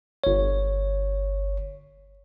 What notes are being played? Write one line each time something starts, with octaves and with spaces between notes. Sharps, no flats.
G1 C#5